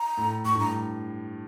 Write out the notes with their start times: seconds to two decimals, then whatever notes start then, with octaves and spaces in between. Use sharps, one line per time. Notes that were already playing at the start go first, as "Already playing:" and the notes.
Already playing: A#5
0.17 A2
0.45 A2 C#6
0.55 G2
0.59 A2 A#5